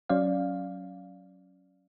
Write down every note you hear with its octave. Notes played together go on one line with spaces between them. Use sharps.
F#3 C#4 D5 F5